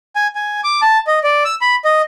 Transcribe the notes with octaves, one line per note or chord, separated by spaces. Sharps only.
G#5
G#5
D6
A5
D#5
D5
E6
B5
D#5